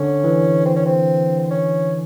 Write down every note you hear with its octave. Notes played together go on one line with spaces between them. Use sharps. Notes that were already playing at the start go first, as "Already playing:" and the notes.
Already playing: D3 C#4
E3
C4
C#4
C4
C4
C#4